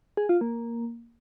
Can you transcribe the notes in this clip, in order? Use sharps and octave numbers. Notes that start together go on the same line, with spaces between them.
G#4
F4
A#3